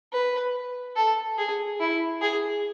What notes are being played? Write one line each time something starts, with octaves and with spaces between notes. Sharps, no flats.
B4
A4
G#4
E4
G#4